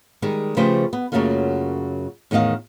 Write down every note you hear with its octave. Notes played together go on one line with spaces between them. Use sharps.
D#3 G3 G#3
C#3 F3 A3 G4 B4 C5
B3
F#2 C#3 F#3 A3 A#3 F4
E2 A2 D#3 D#5 F5